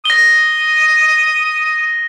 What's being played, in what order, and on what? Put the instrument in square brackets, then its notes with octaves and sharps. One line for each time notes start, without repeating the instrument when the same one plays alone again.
[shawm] D#6 [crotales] A#6 G7